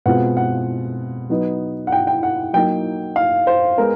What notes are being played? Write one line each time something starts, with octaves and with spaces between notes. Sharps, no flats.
B2 G#3 C4 F4 F#5
F#5
F#3 B3 D#4
F#5
G5
G5
F#5
F#3 A#3 D#4 G5
F5
C5
G#3 B3 A#4